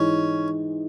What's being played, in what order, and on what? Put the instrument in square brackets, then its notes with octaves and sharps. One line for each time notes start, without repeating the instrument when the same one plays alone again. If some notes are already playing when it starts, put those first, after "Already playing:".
Already playing: [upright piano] G#2 E3 G#3 [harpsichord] C#4